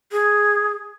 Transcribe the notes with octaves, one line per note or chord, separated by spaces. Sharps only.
G#4